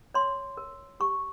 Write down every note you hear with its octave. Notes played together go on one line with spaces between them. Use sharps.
C#5 C6
A#4
G4 C#6